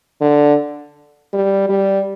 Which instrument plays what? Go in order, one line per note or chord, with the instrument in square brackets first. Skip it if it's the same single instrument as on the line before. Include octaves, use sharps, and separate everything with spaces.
[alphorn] D3
G3
G3